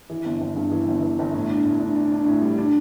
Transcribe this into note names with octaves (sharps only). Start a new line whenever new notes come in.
E3
G1
G1
G2
E3
G1
E3
G1
A2
D4
A2
D4
D4
D4
A2
G3
D4